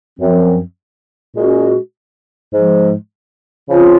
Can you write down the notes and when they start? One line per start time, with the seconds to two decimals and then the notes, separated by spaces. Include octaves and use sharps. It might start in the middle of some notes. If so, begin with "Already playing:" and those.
0.19 F#2 F3 C4
1.36 A#2 G#3 C#4 F#4
2.53 G#2 F3 G#3
3.69 C#3 F3 C4 F4